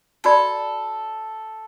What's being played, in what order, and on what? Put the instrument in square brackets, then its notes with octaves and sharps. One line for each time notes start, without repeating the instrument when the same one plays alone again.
[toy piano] F#4 D5 B5 [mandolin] A4